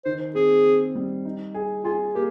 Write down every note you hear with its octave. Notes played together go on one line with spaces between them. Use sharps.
D#3 C5
C4 G#4
C4
G3
D#4
G#4
F4 G#4
A#3 G4